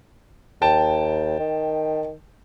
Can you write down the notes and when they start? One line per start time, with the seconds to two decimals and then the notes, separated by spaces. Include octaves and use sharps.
0.62 D#2 G5 A5
1.40 D#3